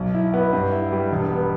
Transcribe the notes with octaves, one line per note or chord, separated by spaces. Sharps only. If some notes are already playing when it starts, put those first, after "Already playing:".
Already playing: B1
E4
B3
G2
E4
G3
E1
B3